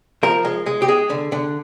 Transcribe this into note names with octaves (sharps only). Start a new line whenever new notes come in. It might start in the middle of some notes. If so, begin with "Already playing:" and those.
F3 A#4
G#3
G#3
G4
G#3 G#4
D3
D3